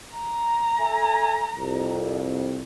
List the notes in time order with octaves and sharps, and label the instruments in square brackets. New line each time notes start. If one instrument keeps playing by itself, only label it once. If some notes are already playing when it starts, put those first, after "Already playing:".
[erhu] A#5
[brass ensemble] A4 E5 G#5
C2 F2